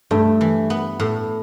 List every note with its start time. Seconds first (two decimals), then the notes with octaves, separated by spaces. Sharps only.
0.11 G2 A3
0.41 E3
0.70 B3
1.00 A2